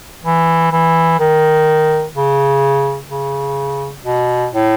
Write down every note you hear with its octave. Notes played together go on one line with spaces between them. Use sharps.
E3
E3
D#3
C#3
C#3
B2
A2